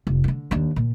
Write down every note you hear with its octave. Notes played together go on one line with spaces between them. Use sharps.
F1
D3 D#3
D#2 D4
A#2